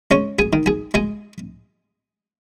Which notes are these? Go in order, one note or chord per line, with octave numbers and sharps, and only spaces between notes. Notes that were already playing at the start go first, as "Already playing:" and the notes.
G#3 C#4 C#5
G#4 G#5
D#3
G#4 G#5
G#3 G#4 G#5